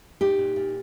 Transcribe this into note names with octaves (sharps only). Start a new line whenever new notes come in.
A#2 D#4 G4
A#2
A#2